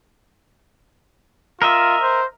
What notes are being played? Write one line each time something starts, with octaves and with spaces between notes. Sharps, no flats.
F4 A#4 D#5 E5
C5